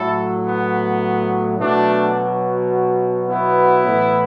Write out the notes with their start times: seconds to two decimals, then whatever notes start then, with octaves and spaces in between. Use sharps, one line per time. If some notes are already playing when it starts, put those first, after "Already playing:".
Already playing: A2 F#3 E4 A4
0.44 B3
1.58 B2 F#3 A3 D4
3.28 B3 E4
3.85 A2 E3